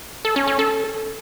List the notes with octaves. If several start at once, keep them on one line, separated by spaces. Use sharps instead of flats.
A4
C#4
C#4
A4